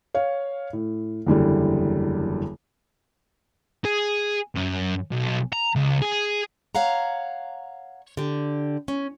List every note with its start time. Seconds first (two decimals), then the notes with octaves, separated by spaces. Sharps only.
0.14 C#5 F5
0.73 A2
1.26 F#1 E2 D3 G3
3.85 G#4
4.55 F#2
5.11 B1
5.53 A#5
5.76 C#2
6.02 G#4
6.75 C#5 F5 F#5 A#5
8.17 D3 G4
8.88 C#4